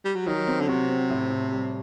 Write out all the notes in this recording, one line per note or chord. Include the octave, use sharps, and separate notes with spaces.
G3
F#3
D#3 F#3
C4
D3
C3 F#4
C4
A2
A2
G3